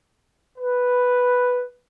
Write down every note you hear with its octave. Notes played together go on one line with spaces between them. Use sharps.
B4